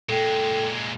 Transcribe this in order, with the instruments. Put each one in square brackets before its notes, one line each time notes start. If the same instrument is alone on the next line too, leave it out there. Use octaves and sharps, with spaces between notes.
[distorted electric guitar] A#2 G#3 [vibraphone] A4 G5